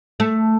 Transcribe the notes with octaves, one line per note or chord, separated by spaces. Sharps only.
A3